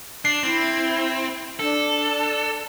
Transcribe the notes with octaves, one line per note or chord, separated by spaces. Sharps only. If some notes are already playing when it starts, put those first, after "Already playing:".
D4 C7
C4 E4
D4 A4